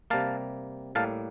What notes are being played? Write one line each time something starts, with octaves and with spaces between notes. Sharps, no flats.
C3 G3 A#3 F5 A5
A2 G3 A#3 F5 A5